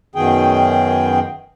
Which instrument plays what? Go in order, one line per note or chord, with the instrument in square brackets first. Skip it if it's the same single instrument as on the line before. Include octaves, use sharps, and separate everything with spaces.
[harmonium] F#2 B2 D#3 G#4 G5